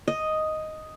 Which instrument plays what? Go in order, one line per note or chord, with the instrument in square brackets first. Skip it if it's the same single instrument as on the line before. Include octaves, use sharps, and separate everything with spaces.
[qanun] D#5